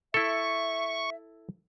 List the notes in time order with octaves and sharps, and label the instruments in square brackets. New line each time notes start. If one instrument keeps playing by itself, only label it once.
[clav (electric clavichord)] E4 A4 [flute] E5 [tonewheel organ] C#6